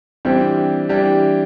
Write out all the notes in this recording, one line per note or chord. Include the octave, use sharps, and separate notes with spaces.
E3 G3 C4 D4 G4
E3 G3 D4 G4